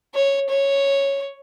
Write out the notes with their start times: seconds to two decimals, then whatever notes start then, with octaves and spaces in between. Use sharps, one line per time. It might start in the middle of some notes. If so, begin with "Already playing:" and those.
0.15 C#5
0.50 C#5